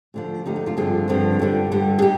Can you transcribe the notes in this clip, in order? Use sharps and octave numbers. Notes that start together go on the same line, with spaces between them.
D2 D3 F3
D2 D3 F3 D#4 G4
D#4
D4 F4
G2 D3 F3 C4 F4 G#4
G2 D3 F3 C4
G2 D3 G3
G2 D3 G3
G#4
D#4 G4